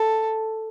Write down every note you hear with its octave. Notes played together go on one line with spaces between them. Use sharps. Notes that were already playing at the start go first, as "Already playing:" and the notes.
Already playing: A4